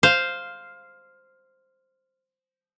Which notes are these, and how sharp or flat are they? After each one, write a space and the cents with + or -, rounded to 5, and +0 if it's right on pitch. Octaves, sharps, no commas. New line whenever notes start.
C5 +0 F5 +0